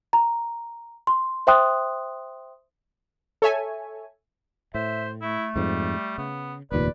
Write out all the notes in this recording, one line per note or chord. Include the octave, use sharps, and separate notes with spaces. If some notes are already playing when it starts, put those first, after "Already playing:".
A#5
C6
C5 E5 G5 C6 D#6 F#6
A4 C#5 E5 G#5
A2 C5 E5
A3 E4
F2 G#2 G3
C#3 B3
F1 D#2 A#2 B4 D5